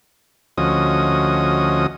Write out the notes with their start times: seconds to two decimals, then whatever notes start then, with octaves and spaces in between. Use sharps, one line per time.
0.58 D2 F3 C#4 F#4 D#5 D#6